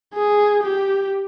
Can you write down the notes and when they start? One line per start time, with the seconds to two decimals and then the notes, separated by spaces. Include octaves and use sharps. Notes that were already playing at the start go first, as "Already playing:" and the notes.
0.14 G#4
0.63 G4